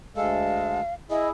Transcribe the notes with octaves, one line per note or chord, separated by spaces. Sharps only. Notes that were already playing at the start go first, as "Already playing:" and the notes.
D2 G#3 A4 F5
E4 G#4 D#5